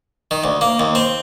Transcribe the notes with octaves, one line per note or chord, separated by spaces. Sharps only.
D#3
D2
A#3
D#2
C4